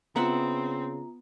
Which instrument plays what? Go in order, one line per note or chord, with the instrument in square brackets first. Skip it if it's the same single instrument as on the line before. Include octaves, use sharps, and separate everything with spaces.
[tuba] C#3 [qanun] B3 E5 F#5 [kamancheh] C4 [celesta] F4 A#5